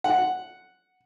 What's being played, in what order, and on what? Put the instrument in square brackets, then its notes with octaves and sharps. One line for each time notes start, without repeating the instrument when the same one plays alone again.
[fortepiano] F#5